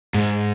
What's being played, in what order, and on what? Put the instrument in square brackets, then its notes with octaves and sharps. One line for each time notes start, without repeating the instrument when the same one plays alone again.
[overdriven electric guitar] G#2